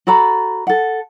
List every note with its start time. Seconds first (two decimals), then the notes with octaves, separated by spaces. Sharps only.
0.07 F#4 A4 A#5 B5
0.67 A4 F#5